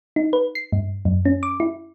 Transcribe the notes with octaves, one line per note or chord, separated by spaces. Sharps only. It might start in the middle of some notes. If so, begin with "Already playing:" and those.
D#4
B4
C7
G2
F#2
C#4
D6
E4